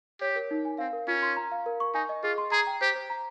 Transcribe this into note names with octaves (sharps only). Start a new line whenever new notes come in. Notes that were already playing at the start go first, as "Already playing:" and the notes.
G4 C#5
A#4
D#4
G#5
C4 F5
A#4
C#4 F4
C6
A#5
F5
A#4
C#6
D#4 G#5
D#5
F4 G#4
C6
G#4 A#5
G5
G4 C5
C5
A#5